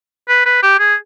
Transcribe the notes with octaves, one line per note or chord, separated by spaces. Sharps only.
B4
B4
G4
G#4